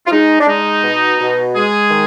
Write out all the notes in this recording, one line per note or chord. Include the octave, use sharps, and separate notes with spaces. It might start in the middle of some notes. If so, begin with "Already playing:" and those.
F4
G#3 D#4
D4
G#3 D#4
B2
B2
G#3 G#4
D#3